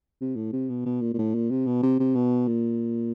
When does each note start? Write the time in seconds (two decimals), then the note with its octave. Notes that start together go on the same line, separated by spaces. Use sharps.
0.21 C3
0.36 A2
0.53 C3
0.69 B2
0.86 B2
1.01 A#2
1.14 A#2
1.18 A2
1.35 A#2
1.50 C3
1.66 B2
1.83 C3
1.99 C3
2.15 B2
2.48 A#2